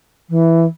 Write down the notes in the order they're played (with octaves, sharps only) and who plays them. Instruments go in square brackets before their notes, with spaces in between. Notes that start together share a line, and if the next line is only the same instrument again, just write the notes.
[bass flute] E3